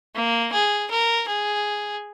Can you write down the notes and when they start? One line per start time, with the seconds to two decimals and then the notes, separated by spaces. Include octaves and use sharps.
0.15 A#3
0.53 G#4
0.90 A#4
1.28 G#4